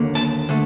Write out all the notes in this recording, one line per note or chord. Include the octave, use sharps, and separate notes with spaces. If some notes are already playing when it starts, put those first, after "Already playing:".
Already playing: D#2 D3 F#3 A#3
A5
D3 A3